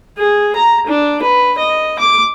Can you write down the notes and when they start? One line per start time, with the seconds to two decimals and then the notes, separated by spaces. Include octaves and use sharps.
0.18 G#4
0.56 A#5
0.87 D4
1.22 B4
1.59 D#5
1.99 D6